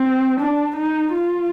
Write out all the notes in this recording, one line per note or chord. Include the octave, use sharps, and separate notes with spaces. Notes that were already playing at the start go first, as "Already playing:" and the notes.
Already playing: C4
D4
D#4
F4